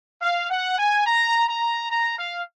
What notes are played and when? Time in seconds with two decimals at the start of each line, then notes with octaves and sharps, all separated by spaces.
0.22 F5
0.51 F#5
0.78 G#5
1.06 A#5
1.49 A#5
1.91 A#5
2.19 F5